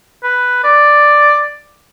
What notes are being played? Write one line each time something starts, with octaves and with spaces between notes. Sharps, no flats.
B4
D5